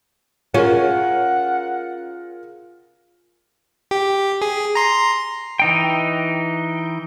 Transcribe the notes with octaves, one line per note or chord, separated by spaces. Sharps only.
C#4 F4 G#4 A#4 F#5
G4
G#4
A#5 C6
E3 D#4 G5